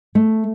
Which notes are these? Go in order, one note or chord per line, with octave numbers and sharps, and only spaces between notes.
A3